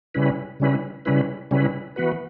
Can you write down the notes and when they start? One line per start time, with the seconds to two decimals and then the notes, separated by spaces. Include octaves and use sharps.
0.15 C#3 G3 C#4 E4 B4
0.60 C#3 G3 C#4 E4 B4
1.05 C#3 G3 C#4 E4 B4
1.51 C#3 G3 C#4 E4 B4
1.96 E3 B3 F#4 B4